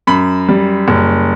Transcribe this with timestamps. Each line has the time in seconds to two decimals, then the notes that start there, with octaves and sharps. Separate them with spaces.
0.07 F#2 B5
0.49 G3
0.88 F#1